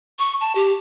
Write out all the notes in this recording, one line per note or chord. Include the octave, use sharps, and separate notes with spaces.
C#6
A5
G4